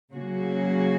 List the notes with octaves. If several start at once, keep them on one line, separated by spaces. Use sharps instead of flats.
C#3 F#3 A#3 C#4 F#4